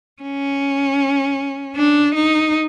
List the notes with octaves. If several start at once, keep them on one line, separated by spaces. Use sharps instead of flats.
C#4
D4
D#4